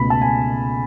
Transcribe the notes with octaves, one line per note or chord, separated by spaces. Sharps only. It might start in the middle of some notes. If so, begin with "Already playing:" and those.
Already playing: C#2 B2 A3 B5
A5
G#5